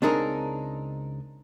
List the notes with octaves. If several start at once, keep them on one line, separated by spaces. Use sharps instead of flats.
C#2 C4 D4 D#4 G#4 A#4